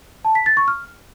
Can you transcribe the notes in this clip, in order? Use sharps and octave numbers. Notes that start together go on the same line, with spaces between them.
A5
B6
A6
C#6
F6